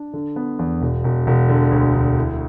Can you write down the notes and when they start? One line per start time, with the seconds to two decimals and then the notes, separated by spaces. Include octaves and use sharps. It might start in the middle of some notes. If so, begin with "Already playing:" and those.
Already playing: D4
0.13 D3
0.36 B3
0.59 E2
0.82 E1
1.04 E1
1.27 E1
1.49 D3
1.72 D2
1.95 D2
2.18 E4